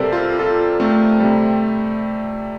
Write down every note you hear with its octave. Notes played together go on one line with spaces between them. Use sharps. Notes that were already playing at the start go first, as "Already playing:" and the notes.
Already playing: C3 G3 A4 A#4 C5 D5
F4 A4
F4 A4
A3 C4
C3 G3